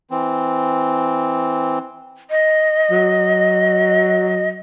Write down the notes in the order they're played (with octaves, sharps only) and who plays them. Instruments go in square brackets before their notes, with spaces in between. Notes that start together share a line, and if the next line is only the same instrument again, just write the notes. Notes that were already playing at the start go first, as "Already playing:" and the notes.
[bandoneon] E3 C4
[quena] D#5
[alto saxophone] F#3